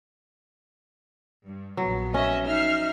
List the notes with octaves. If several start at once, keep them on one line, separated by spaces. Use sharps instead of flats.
G2
A#1 F#3 B3
C#4 D#5 E5
D#4 E5 F6 C7